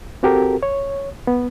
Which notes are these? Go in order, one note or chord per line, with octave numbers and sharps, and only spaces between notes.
C4 F#4 G4 A4 A#4
C#5
B3